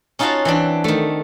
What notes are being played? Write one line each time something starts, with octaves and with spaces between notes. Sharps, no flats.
C#4 D#4 F4 F#4 F5 A5
E3 C4 D4
D#3 A3